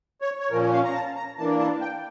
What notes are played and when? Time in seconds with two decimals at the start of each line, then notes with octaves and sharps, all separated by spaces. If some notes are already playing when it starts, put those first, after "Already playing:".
0.21 C#5
0.40 C#5
0.50 A#2 F3 C#4 A#4
0.73 F5
0.84 A#5
0.94 A5
1.16 A#5
1.38 E3 A#3 D4 A5
1.60 A5
1.81 G5